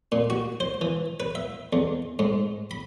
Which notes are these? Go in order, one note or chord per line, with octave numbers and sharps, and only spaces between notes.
A#2
F#4
C5
E3
B4
E5
E2
G#2
B5